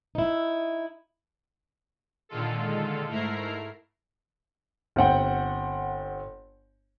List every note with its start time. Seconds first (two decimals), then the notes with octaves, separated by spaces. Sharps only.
0.15 D#4 E4
2.29 A#2 D3 D#3 G#3 F4 A4
3.07 G#2 A3 E4 A#4 A#5 C7
4.96 G1 C4 F#5 G5